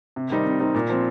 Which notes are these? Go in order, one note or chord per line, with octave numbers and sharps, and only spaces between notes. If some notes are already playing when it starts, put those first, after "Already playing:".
C3
D#3 G3 C4 D#4
C3
D#3 G3 C4 D#4
A#2
F3 C4